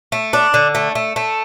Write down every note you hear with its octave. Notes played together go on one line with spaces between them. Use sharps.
A3
D4
D3
A3
A3
A3